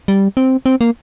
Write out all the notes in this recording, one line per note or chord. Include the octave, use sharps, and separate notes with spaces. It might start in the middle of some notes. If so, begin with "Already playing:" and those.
G3
C4
C4
A#3